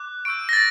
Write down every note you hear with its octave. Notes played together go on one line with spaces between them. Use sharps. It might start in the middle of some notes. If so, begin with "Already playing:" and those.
Already playing: D6 F#6
C#6 E6 G6 D7
A#6
A6